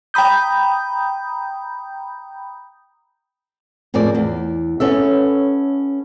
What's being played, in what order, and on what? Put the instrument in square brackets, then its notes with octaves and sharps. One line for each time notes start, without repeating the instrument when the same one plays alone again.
[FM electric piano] G5 A#5 B5 D#6 G6
[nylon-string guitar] F2 A2 G#4 A#4 D5
E2
B3 C#4 A4 E5